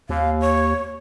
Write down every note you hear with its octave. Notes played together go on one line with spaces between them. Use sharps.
D#2 F5
C#5